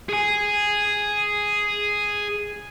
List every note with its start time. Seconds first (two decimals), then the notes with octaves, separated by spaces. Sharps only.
0.09 G#4 G#5